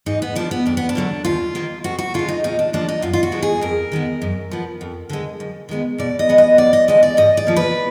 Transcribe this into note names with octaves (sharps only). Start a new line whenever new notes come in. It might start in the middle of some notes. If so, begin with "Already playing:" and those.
G#2 D#4
B3
F3 A#3 D4
B3
F2 D4
B3
D4
D3 F#3 A#3
D#2 F4
D#3 A#3
F2 F#4
F#4
D3 G#3 F4
D#4
A#2 D#4
D4
F3 A#3 D4
D#4
F#2 F4
F4
F#4
D3 G#3 B3
G#4
F2 A#4
D#3 G#3 B3
F#2
F3 B3
F2
D3 G#3
F#2
D#3 G#3 B3
B2 D5
D#5
G#3 B3
D#5
F#2 D5
D#5
D3 G#3 B3 D#5
D5
G#2 D#5
D5
F3 A#3
B4